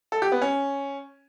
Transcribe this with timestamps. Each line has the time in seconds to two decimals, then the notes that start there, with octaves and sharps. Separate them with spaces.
0.12 A4
0.22 G4
0.32 B3
0.42 C#4